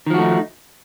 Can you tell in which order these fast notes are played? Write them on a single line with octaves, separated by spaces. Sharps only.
D#3 F3 F#4 A3 D#4